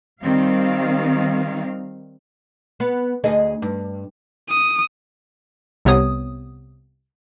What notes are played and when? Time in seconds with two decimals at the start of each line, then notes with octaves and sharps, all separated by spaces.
0.21 D#3 G3 C4 F5
2.80 B3
3.24 D2 G#4 D#5
3.62 G2
4.49 D#6
5.85 C2 C3 B3 C#5 D#6